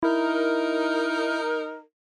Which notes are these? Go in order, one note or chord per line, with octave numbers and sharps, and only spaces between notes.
D#4 E4 A#4